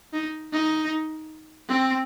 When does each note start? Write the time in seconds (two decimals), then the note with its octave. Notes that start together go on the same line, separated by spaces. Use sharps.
0.13 D#4
0.53 D#4
1.69 C4